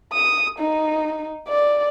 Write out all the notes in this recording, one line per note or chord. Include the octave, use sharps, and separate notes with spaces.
D#6
D#4
D5